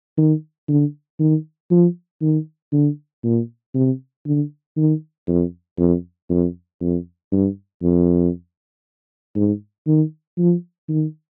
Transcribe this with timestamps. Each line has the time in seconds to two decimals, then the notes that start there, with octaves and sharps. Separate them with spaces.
0.17 D#3
0.69 D3
1.19 D#3
1.71 F3
2.22 D#3
2.72 D3
3.24 A#2
3.75 C3
4.26 D3
4.77 D#3
5.28 F2
5.78 F2
6.30 F2
6.81 F2
7.32 G2
7.83 F2
9.36 G#2
9.87 D#3
10.38 F3
10.89 D#3